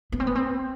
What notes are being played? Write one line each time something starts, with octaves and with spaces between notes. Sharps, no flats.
B3
C4
B3
C4